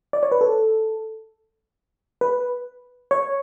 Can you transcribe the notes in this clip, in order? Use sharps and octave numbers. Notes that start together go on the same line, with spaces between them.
D5
C#5
B4
A4
B4
C#5